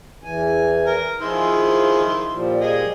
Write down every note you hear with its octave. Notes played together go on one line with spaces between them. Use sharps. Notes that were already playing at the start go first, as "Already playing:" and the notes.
E2 E3 G#5
A#4
D#3 F3 E4 G#4 C6
A#2 F3 G3
G#4 D#5